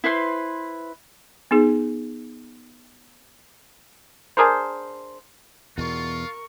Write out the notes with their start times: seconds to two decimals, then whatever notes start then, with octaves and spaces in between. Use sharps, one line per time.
0.04 E4 B4 C5 C6
1.51 B3 D#4 G#4
4.37 D4 G#4 A#4 C5
5.78 E2 B2 F4 A#4 C#6